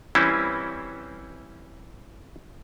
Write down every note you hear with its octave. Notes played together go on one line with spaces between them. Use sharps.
E3 G3 C4 C#4 E4